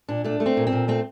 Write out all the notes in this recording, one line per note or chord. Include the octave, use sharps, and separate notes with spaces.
A#2 D4
A3 D4
A3
C4
A#2
C4
A#2
A3 C4